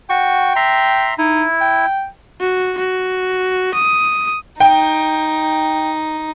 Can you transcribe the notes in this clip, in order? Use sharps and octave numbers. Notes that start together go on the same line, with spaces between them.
F#4 G5 C#6
E5 A#5 C6
D#4 E4
G5
F#4
F#4
D#6
D#4 G5